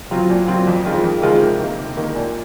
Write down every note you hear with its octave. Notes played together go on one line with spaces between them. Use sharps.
F#3 C4 F4
A#2
F#3 C4 F4
F2
D#3 G#3 C4 F4
F2
D#3 G#3 C4 F4
C3
D#3 A#3
C3
D#3 A#3
A#2